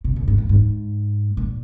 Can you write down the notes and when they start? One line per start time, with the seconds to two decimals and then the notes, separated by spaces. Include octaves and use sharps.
0.04 C3
0.16 A#2
0.28 G#2
0.38 F2
0.49 G#2
1.37 A#2